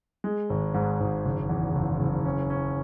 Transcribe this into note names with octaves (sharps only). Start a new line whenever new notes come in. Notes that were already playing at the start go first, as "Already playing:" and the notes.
G#3
G#1
G#2
G#1
F#1
E2
F#1
F#1
C#4
C#4